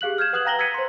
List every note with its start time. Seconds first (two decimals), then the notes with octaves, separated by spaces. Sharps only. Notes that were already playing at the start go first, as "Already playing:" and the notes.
0.01 G4 G#4 F5 F#6 F#7
0.18 F6 G6 G#6 E7
0.33 B4 F#5 D#6 F#6 G#6 F#7
0.45 F5 G5 A#5 A#6 F#7 G7
0.59 E6 G#6 A#6 B6 C#7 D#7
0.74 C5 C6